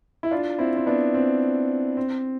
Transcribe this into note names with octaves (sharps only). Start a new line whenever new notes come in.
E4
D4 F4
C4 E4
C4
B3 D4
C4
C4